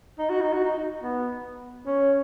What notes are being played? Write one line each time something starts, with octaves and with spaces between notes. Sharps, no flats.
D#4
F#4
D#4
F#4
D#4
B3
C#4